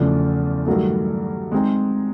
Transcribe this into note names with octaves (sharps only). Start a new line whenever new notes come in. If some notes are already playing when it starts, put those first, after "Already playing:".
Already playing: E2 C#3 F3 A3 D4
G2 D#3 F#3 A3
G#3 C4 D#4